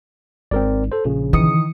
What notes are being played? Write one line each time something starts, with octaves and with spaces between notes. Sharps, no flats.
G#1 C4 A#4 D5
A4 C5
A#1 C#3
D#3 E3 D#6 C#7